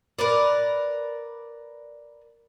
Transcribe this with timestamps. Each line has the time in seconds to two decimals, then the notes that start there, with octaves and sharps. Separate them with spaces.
0.19 A#4 B4 D5